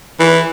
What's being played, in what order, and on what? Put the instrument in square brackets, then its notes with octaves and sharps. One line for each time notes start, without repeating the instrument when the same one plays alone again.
[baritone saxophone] E3